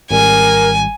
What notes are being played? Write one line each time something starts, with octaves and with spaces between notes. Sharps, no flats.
G#1 G3 A#4 G#5